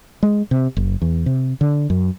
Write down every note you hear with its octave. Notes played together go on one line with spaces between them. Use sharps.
G#3
C3
F#1
E2
C3
D3
F#2